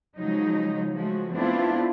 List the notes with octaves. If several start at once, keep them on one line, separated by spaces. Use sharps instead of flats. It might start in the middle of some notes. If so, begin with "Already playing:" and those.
C#3 F3 F#3 G#3 D#4
F3 G#3 A3 F#4
A3 B3 C4 D4 E4 F4